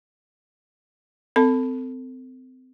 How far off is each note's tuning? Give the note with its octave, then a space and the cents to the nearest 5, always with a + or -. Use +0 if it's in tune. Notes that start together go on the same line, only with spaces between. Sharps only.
C4 -30 A4 +25 A5 +0